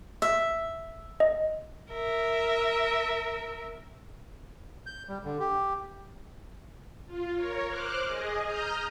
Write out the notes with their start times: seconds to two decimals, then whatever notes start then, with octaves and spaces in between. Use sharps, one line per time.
0.22 E5
1.20 D#5
1.92 A#4 E5
4.86 G6
5.08 G3
5.24 D3
5.40 G4
7.07 F4
7.35 A#4 C#5
7.69 C5 D6 F6 F#6
8.05 G#4 D#5
8.44 A#5 D#6 F6 G6